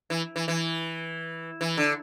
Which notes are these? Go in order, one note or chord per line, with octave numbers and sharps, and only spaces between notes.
E3
E3
E3
E3
D3